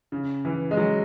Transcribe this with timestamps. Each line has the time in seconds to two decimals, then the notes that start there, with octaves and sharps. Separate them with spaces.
0.12 C#3
0.45 E3
0.71 G#3
0.77 F#3